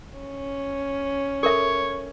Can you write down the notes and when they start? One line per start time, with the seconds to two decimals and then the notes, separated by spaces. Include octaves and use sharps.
0.18 C#4
1.43 A4 A#4 C#5 E5